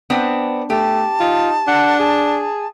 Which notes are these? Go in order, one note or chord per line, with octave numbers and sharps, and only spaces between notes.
B3 C4 D4
A3 G4 A5
D#4 F4
D4 F#5
G#4